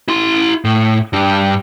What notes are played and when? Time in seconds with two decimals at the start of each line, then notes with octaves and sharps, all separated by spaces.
0.08 E4 C6
0.65 A2
1.13 G2 D4